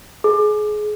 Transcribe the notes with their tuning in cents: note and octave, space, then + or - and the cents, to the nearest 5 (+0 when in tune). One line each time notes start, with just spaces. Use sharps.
G#4 +25